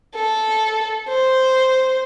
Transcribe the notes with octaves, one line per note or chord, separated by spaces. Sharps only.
A4
C5